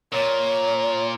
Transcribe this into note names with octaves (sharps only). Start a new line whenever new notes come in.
A#2 C#5